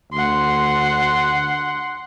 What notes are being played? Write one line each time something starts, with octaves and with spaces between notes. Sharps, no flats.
D2 F#5 C6